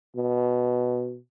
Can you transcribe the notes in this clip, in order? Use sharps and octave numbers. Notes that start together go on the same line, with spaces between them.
B2